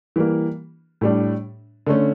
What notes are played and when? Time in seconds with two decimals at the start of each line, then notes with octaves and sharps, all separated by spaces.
0.16 E3 G3 A#3
1.01 A2 G3 D4
1.87 D3 A3 C#4